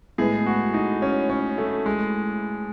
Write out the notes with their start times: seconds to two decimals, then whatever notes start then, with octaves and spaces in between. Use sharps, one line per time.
0.18 A2 G#3 B3 G#4
0.46 F#4
0.74 D#4
1.02 C#4
1.30 C#4
1.58 A3
1.86 G#3